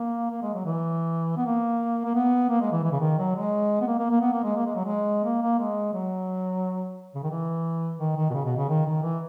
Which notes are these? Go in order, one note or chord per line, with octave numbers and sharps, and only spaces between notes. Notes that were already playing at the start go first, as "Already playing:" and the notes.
Already playing: A#3
A#3
G#3
F#3
E3
B3
A#3
A#3
B3
A#3
G#3
E3
E3
C#3
D#3
F#3
G#3
B3
A#3
A#3
A#3
B3
A#3
G#3
A#3
G#3
F#3
G#3
A#3
A#3
G#3
F#3
C#3
D#3
E3
D#3
D#3
B2
C#3
B2
C#3
D#3
D#3
E3